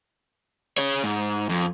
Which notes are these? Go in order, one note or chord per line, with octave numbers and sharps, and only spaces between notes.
G#4 C#5
G#2
F2